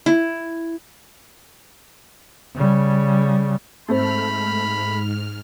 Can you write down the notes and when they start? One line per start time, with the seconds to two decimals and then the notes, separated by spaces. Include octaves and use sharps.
0.06 E4
2.55 C#3 G3
3.88 G#2 A3 C4 C5 B5 F6